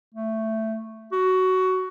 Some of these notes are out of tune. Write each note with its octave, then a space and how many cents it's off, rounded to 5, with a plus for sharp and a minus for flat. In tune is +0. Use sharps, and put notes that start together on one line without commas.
A3 +10
F#4 +15